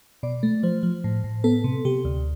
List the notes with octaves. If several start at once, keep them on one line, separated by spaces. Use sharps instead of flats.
B2 D5
A3
F3 C5
F3
A2
A2
B3 A4
C3
C3 G4
D2